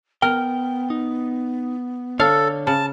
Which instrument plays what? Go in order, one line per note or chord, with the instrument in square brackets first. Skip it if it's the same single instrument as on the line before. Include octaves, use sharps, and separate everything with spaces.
[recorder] B3 [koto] A#4 [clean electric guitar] G5
[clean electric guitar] D#4
[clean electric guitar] D3 C#5 [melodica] A4 [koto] F5
[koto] C#3 [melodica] A5